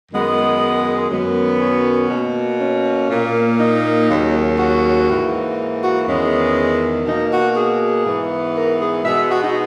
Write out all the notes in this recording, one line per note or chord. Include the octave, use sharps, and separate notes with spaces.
F#2 D#3 G#3 B3
F#2 D#3 F#3 B3
C#4
B2 A#3
C#4
A#2 A#3
D#4
D#2 C#3 F#3
F#4
G#2 E3 A#3
F#4
E2 D#3 G#3 B3 C#4
B2 A#3 D#4
F#4
G#4
G#2 E3 B3
A#4
G#4
B2 G#3 B3 E5
F#4
D#4